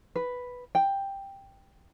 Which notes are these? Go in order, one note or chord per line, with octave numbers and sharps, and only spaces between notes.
B4
G5